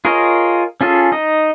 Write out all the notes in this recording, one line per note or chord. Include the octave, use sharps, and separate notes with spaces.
F4 G#4 A#4 C#5 D#5
C#4 F4 G#4 A4
D#4 D#5